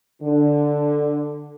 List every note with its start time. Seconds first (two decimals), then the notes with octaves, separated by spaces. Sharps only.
0.22 D3